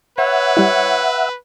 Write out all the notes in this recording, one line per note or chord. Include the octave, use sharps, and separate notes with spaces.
B4 C#5 E5 F#5
G3 E4